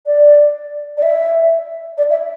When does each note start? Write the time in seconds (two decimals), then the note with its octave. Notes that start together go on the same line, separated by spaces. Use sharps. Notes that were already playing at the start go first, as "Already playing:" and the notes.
0.06 D5
0.97 D5
1.03 E5
1.98 D5
2.10 E5